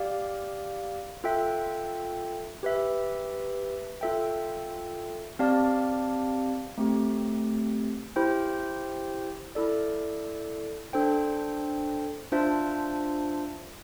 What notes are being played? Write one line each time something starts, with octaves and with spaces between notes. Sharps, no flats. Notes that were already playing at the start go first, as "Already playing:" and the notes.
Already playing: G4 D5 F5
F4 A4 E5 G5
G4 B4 E5
F4 A4 E5 G5
C4 G4 D5 F5 A5
A3 C4 G4
E4 G4 C5 G5
E4 A4 D5
D4 A4 C5 G5
D4 F4 C5 E5 A5